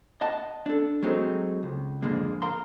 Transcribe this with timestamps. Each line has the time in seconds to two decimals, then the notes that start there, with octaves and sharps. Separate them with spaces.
0.21 D#5 F#5 A5
0.66 D4 A4
1.03 F#3 G#3 A3 C4 D#4
1.63 C#2
2.02 F2 G#2 D3 G#3 A#3
2.42 A#4 F5 A#5 C6